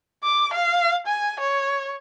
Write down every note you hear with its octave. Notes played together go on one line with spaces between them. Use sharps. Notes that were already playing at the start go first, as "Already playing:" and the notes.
D6
F5
G#5
C#5